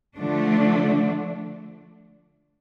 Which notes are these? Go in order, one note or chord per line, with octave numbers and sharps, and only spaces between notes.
D3 F3 A3 D4